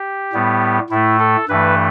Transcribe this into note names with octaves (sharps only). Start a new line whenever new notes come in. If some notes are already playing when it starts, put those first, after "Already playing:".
Already playing: G4
A2 G3 B3
A2 A3 E4
A4
G2 E3 A3 B4